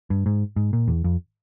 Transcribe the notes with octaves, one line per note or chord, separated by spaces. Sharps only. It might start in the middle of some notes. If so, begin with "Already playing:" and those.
G2
G#2
G#2
A#2
E2
F2